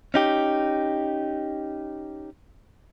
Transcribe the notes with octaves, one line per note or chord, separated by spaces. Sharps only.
C#4 D#4 G4